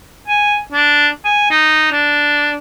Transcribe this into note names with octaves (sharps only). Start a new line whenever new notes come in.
G#5
D4
G#5
D#4
D4